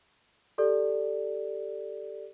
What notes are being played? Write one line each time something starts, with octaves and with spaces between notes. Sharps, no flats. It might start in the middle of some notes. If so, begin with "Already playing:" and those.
G4 A4 D5